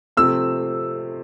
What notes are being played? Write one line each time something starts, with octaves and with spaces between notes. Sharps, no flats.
C3 F3 A3 C4 E6